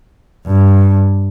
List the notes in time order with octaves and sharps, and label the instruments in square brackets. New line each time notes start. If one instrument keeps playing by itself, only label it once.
[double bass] G2